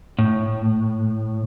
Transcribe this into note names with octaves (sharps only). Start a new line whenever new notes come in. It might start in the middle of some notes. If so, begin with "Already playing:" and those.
A2